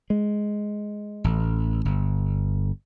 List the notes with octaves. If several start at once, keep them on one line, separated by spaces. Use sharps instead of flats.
G#3
A1
G1